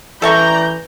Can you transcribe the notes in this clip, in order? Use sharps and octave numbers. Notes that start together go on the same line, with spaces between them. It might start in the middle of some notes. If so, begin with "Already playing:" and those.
A1 E3 A4 D5 E5 A#5 C#6 G6